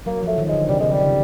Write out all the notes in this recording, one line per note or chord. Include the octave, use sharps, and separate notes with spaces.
F#3 A#3
F3 A3
D#3
G#3
D3
C3 G3
C#3 G#3
G3
C#3